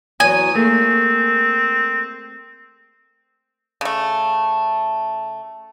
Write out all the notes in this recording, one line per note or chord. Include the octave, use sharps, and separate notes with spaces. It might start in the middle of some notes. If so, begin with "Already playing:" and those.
E2 F#3 G#5 D#6
A3 A#3 C4 G#4
C#3 A3